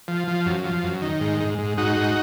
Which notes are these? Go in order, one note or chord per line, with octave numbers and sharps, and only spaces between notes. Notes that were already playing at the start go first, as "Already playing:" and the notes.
F3
F3
F#2
F3
F#2
D#3
G#2
G#2
G#2
G#2 D#4 F#4
G#2